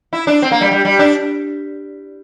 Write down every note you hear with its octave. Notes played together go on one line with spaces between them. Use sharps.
E4
D4
C4
A#3
G3
G3
G3
D4